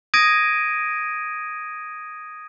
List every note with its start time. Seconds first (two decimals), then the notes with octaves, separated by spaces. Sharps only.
0.14 D#6 G#6 A#6 D7 D#7